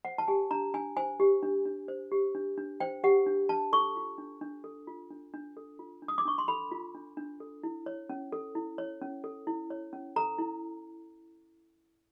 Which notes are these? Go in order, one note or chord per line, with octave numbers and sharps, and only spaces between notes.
C5 F#5
A5
G4 G#5
D4 A#5
D4 G#5
C5 G#5
G4
D4
D4
C5
G4
D4
D4
C5 G5
G4 F#5
D4
D4 A5
A4 C#6
F4
D4
D4
A4
F4
D4
D4
A4
F4
D4
D#6
D6
D4 C#6
C6
A4 B5
F4
D4
D4
A4
E4
C#5
C#4
A4
E4
C#5
C#4
A4
E4
C#5
C#4
A4 A#5
E4